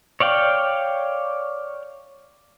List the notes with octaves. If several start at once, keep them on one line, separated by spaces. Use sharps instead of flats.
C#5 D5 F5 G5